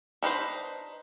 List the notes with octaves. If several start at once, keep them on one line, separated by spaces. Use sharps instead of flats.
D4 D#4 B4 C5